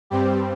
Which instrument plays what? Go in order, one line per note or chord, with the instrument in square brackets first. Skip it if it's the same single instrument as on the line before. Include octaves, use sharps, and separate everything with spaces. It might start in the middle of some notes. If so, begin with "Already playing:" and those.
[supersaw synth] G2 G3 C4 G4